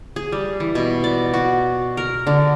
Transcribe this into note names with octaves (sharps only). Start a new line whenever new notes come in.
G#4
G3
E3
B2
D5
F#4
A#4
D3